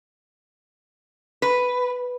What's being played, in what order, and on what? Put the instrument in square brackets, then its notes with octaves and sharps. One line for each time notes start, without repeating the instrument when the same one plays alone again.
[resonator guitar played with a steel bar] B4